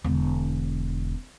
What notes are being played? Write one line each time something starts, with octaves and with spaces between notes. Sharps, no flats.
E1 D3